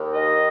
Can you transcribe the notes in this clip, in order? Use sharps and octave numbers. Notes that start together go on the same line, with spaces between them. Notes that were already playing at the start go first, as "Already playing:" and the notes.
Already playing: D#2
D#3 D#5